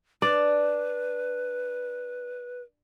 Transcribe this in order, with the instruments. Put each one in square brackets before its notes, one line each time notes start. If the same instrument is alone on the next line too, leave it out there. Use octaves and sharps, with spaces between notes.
[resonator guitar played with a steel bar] D4 [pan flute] B4 [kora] D5